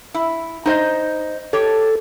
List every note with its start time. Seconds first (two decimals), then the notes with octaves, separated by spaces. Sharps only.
0.14 E4
0.66 D#4 C5 D#5
1.53 G4 A4 C#5